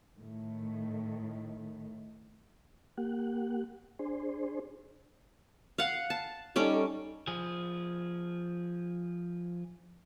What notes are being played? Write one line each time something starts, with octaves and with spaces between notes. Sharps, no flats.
A2 D#3 A3
A#3 G4 F#5
D4 G#4 C5
F5 F#5
A5
G3 C#4 D#4 A4 D6
F3 G#4